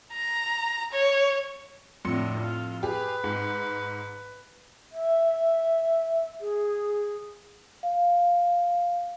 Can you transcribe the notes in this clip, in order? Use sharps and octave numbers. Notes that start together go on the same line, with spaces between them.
A#5
C#5
F2 A2 D3 C6 C#7
F4
G4 G#4 B4
G#2
E5
G#4
F5